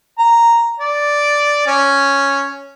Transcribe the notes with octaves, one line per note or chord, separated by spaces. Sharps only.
A#5
D5
C#4